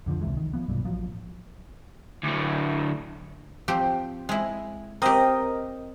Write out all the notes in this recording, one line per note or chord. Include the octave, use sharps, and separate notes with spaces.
F2 D3 E3 F3
C#2 C3 E3 G#3
D#3
F3 B3
B1 G2 A#2
A1 F3 F#3
D2 A2
F3 C4 G4
G#3 E4
C4 G4 A#4 D#5